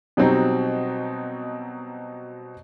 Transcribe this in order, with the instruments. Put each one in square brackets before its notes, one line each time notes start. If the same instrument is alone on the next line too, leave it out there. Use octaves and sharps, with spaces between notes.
[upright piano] B2 F#3 G3 C4 D#4